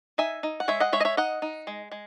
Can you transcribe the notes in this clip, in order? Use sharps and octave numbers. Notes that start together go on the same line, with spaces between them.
D#4 E5 G#5
D#4
F#5
G#3 C#5 E5
D#5 F#5
G#3 C#5 E5
D#5
C#5 E5
D#4 D#5 F#5
D#4
G#3
G#3